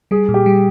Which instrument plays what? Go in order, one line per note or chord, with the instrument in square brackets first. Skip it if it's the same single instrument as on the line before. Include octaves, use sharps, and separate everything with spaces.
[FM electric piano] G3 [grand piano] G#4
[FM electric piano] A#2
[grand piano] G4
[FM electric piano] G3